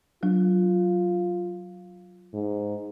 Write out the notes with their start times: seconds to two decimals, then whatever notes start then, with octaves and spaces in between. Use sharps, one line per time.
0.23 F#3 D4 F4
2.34 G#2